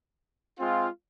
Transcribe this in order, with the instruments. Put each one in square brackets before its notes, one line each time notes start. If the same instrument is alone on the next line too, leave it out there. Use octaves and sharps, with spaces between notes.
[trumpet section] G#3 C4 F4